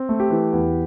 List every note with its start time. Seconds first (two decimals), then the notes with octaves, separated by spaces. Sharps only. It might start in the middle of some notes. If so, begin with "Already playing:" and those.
Already playing: C4
0.09 A3
0.20 G4
0.30 E3
0.53 E2